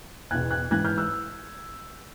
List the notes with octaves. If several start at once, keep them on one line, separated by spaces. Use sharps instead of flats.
E2 B2 F#6 G#6
F#6 G#6
G#2 E3 F#6 G#6
F6 G6
E6 F#6